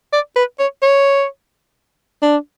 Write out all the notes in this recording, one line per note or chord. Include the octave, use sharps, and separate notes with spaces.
D5
B4
C#5
C#5
D4